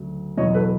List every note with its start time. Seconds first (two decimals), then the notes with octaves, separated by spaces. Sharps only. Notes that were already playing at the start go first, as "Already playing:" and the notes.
Already playing: D2 C#3 F#3
0.37 E2 B2 F#3 C#5 D#5
0.54 A4 B4